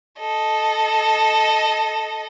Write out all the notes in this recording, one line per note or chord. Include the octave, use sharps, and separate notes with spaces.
A4 D#5